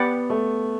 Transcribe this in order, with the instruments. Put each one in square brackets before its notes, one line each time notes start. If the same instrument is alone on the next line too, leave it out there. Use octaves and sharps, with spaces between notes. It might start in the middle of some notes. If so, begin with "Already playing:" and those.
Already playing: [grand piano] B3 [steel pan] G4 D5 F#5 B5
[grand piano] A3